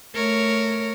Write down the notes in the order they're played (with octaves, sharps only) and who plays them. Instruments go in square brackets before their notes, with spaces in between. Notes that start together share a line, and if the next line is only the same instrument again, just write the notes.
[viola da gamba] A3 A#4 C#5